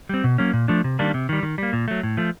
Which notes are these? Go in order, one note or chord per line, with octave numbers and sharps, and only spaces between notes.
G3 C4
B2
F#3 A#3 C#4
A#2
F3 A3 D4
C3
D#3 G3 A#3 D4
C3
D#3 G3
D#3
G3 A#3
A#2
F#3 A3
A2
F3 A3